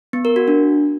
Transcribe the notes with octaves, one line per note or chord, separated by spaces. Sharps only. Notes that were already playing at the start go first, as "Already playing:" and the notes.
B3
A#4
F#4
D4